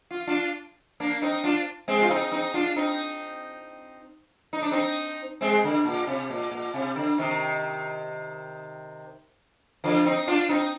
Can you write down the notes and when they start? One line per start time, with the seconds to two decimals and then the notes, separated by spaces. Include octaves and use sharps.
0.11 F4
0.27 D4 F4
1.00 A#3 D4
1.22 C4 D#4
1.44 D4 F4
1.88 G#3 C4
2.02 F4
2.10 C4 D#4
2.31 C4 D#4
2.54 D4 F4
2.76 C4 D#4
4.53 D#4
4.62 D4
4.71 C4 D#4
5.41 G#3 C4
5.64 D3
5.85 A#2
6.07 C3
6.30 A#2
6.51 A#2
6.74 C3
6.96 D3
7.18 C3 D#3
9.84 D3 F3
10.05 C4 D#4
10.27 D4 F4
10.49 C4 D#4